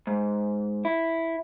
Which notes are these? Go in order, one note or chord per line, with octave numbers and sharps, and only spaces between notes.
G#2
E4